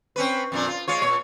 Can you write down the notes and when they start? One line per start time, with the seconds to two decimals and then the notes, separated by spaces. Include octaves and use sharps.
0.16 C4 C#4 B4
0.52 F2 A#2 D4
0.68 F4
0.88 G#3 F4 C#5
1.02 A#2 C#5